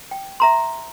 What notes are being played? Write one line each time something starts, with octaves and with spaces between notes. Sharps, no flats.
G5
E5 A#5 C6